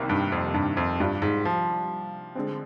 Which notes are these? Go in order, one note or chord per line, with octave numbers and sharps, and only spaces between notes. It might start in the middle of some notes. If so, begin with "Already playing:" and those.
Already playing: C2 C3 D#3 G3 A#3
G2
F2
G2
F2
G2 G3 D4 F4
G#2
F3
D3 G#3 C4